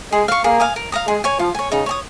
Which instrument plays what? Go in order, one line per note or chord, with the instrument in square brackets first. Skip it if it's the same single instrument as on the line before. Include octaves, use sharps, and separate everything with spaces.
[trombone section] G#3 [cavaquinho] G#4
[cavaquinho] F5 C#6
[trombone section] A#3 [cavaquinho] G#4
[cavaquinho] F5 G#5 D#6
A#4
F5 A#5 D#6
[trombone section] G#3 [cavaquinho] G#4
[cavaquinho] C#5 G#5
[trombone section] F3 [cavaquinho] F4
[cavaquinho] C#5 G#5
[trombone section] C#3 [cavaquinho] D#4
[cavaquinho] C#5 G#5 D#6